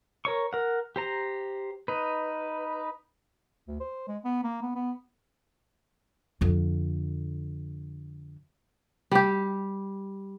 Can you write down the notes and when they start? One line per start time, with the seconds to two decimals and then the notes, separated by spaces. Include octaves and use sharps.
0.25 A#4 C#5 C#6
0.53 A#4 F#5
0.96 G4 C5 A#5
1.88 D#4 B4
3.68 D2
3.80 C5
4.08 G#3
4.25 B3
4.44 A#3
4.62 B3
4.76 B3
6.41 F2 D3
9.11 G3 G4